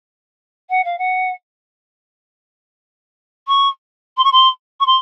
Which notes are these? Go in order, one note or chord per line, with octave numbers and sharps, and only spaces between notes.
F#5
F5
F#5
C#6
C6
C#6
C6
C#6
C6